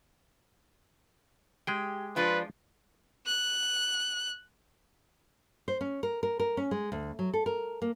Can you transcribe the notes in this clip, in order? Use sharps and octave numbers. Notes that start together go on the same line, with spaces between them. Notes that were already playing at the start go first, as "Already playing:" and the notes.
G#3 G4 G#4 G5
F3 D4 F4 B4
F#6
C5
C#4
A#4
A#4
A#4
C#4
G#3
D2
F#3
A4
A#4
A#3